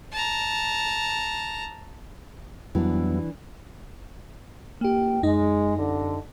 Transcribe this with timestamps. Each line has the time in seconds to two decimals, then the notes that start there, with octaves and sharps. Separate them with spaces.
0.12 A5 A#5
2.75 F2 E3 F#3 G3 B3 D4 E4
4.81 C#2 A2 A#3 G4 G5
5.23 F#2 G#3 D#4 D#5
5.76 C2 D3